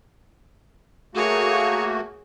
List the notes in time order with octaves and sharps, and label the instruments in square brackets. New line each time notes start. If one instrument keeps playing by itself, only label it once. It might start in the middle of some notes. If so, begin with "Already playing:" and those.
[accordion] A3 A#3 F#4 [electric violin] G#4 C#5